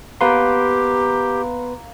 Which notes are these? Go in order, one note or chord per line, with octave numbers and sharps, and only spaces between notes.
A#3 B3 G4 B4 C6